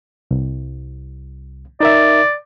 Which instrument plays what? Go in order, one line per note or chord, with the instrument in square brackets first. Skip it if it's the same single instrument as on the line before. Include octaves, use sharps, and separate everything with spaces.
[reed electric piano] C2
[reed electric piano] D#4 A#4 E5 [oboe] D5